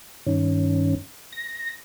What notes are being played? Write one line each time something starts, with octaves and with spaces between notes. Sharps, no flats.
G2 D#3 C#4
A#6